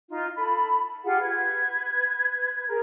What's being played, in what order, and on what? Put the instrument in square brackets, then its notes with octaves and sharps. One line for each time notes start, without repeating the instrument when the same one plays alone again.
[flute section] D#4 F4
A4 B5
F4 G4 G#4 F#5
B4 G#6
G#4 A#4